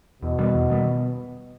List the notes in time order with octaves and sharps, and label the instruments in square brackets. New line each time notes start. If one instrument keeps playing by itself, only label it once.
[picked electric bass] E2 [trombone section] B2
[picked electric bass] D#3 G3 B3
E2
D#3 G3 B3